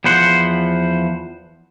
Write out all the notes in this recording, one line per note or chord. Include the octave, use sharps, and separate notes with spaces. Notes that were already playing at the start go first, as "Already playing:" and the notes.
E2 F3 B4 C5 F#5